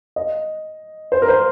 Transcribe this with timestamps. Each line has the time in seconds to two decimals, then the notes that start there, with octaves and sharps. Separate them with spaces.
0.16 D#5
1.12 C5
1.22 A#4
1.28 C5